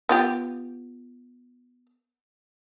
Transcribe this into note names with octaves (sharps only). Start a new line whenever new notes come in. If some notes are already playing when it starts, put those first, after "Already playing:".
B3 F4 G4